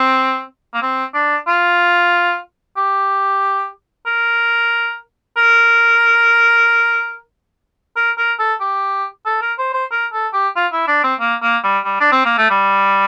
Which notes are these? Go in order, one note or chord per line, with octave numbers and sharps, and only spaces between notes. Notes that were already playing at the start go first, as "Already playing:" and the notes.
Already playing: C4
A#3
C4
D4
F4
G4
A#4
A#4
A#4
A#4
A4
G4
A4
A#4
C5
C5
A#4
A4
G4
F4
E4
D4
C4
A#3
A#3
G3
G3
D4
C4
A#3
A3
G3